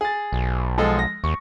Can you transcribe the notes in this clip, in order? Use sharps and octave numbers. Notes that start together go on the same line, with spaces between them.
G#4 A6
B1
F3 G#3 A4
A#6
D#2 C#6